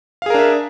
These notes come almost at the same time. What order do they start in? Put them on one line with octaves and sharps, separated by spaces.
F5 G#4 A#4 D4 E5